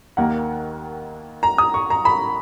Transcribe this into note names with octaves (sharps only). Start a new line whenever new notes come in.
D#2 D#3 A#3 F#5
A#5
D#6
C#6
A#5
B5